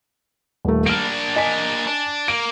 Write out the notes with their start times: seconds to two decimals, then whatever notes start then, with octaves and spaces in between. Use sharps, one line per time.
0.65 D#1 A3
0.86 A#3 D4 F6 D7
1.36 D#5 G#5 B6
1.87 D4
2.28 A#3 D7